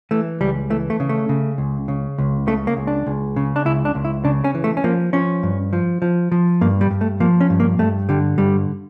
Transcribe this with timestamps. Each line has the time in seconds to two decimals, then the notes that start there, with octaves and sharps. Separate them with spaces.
0.11 E3 A3
0.41 C#2 G3
0.70 E3 A3
0.90 A3
1.00 C#3
1.09 A3
1.29 C#3
1.58 C#2
1.88 C#3
2.18 C#2
2.47 C#3 A3
2.67 A#3
2.77 C#2
2.87 D4
3.07 C#2
3.36 C#3
3.56 D4
3.65 C#2 E4
3.85 D4
3.95 C#2
4.05 E4
4.25 C#3 D4
4.44 C#4
4.55 E3
4.64 A3
4.77 C#4
4.84 F3 A#3
5.13 F3 C#4
5.43 G2
5.73 F3
6.02 F3
6.32 F3
6.61 G2 A#3
6.81 G3
6.91 G2
7.01 A3
7.20 F3 A#3
7.41 C#4
7.50 G2
7.60 A#3
7.79 G2 A3
8.09 D3 G3
8.38 G2 G3